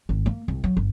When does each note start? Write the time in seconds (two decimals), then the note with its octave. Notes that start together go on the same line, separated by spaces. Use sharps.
0.09 G#1
0.26 A#3
0.48 C2
0.64 F#3
0.77 G1